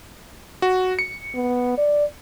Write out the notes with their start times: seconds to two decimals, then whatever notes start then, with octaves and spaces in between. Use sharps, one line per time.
0.62 F#4
0.99 C#7
1.35 B3
1.78 D5